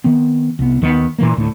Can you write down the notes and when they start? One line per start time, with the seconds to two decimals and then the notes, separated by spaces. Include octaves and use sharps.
0.04 D#3 B3 C4
0.59 C2 B3
0.82 D#2 D#3 A3 B3
1.18 A#2 E3 A#3
1.37 D2 A2